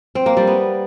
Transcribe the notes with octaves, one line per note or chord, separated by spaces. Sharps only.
C4
A#3
G3
B3